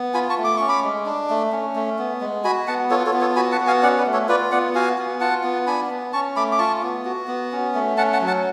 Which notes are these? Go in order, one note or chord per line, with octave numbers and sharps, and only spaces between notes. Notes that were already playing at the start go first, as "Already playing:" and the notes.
Already playing: B3
F4 G#5 B5
A5 C#6
A3
D6
C#4 C#6
B5 D6
G#3
D4
A3
C#4
A3
B3
G#3
F#4 G#5 B5
B3 F#5 A5
F4 A4 C#5
A4 C#5
B3
A4 C#5
F#4 G#5 B5
F#5 A5
B3
F5 G#5
C#4 D5 F#5
B4 D5
A3
A4 C#5
F4 B4 D5
B3 D5 F#5
F#4 F5 G#5
B3
F4 F#5 A5
B3
D4 G#5 B5
B3
C#4 A5 C#6
A3 B5 D6
D6
F4 A5 C#6
B3
F#4
B3
C#4
A3
C#4 F#5 A5
F#5 A5
F#3
F#5 A5